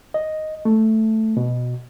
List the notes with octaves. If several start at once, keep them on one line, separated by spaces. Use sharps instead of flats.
D#5
A3
B2